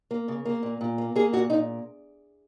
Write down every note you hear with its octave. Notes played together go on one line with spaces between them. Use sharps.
A#3
C#3
A#3
A#2
A#2
A#3
A#3 G#4
A#2 F#4
A#2 D#4